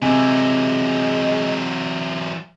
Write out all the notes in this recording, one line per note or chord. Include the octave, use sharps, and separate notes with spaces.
C3 E3 F#3 G#3 G#5